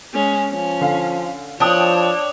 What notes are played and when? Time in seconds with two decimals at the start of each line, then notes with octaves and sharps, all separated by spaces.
0.13 G#3 C#4
0.50 F3 C#4
0.81 D3 F5
1.60 F3 D4 C#5 G5 A5 D#6